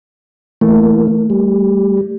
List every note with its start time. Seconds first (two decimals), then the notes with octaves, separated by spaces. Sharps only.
0.61 E3 A3 A#3
1.30 G3